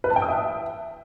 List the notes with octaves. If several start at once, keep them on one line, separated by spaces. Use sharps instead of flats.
B4
A5
G5
D#6
E5